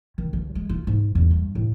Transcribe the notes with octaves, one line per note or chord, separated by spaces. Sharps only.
D#3
D2
G#3
F4
G#2
E2
G2
A2